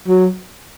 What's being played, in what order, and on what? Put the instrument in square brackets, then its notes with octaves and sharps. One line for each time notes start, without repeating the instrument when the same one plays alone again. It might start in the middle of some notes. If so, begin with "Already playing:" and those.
[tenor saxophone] F#3